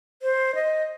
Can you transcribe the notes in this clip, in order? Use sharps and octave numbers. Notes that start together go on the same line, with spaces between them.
C5
D#5